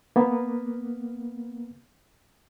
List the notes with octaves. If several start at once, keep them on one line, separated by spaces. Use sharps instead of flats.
A#3 B3